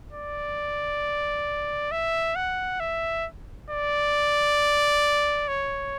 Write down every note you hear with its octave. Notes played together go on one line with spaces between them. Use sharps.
D5
E5
F#5
E5
D5
C#5